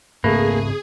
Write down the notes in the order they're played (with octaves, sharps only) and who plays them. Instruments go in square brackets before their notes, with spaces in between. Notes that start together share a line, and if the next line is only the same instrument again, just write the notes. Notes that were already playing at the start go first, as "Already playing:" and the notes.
[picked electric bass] G#2 C#3 C4 [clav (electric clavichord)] A3 B4 [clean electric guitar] A#3 [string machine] G#4